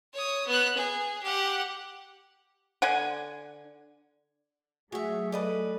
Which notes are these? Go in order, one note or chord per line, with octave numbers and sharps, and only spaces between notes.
C#5 D#6
B3 F#6
G#4
G4 F#5
D3 F#5 G#5
F#3 A3 F#4 G#4 C#5 E5
A4 B4 D5 D#5 D6